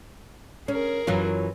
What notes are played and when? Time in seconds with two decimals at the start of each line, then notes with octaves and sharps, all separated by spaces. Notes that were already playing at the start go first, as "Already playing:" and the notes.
0.68 C#4 G#4 A#4
1.07 F#2 E3 F#3 F4